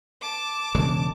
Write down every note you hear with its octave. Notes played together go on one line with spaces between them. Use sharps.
A5 D6
E1 C#3 G#3